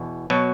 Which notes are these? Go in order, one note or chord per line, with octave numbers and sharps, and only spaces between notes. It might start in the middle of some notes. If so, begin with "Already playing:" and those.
Already playing: E2 B2
B2 F#3